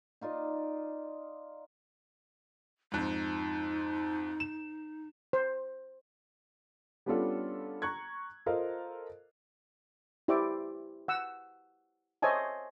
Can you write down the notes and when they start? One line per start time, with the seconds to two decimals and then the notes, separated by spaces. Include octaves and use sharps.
0.21 D#4 F4 D5 D#5
2.92 F2 G#2 D#4
4.40 E7
5.33 C5
7.06 G3 B3 C#4 D4 F4 A4
7.82 A#5 C#6 F#6 G#6
8.46 F4 A4 A#4 C5 D#5 F5
10.28 E4 G4 C5 D5 E5 D6
11.08 F#5 E6
12.22 C5 C#5 D#5 E5 G#5 A5